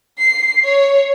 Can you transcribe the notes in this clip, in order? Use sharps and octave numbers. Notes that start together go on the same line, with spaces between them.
C7
C#5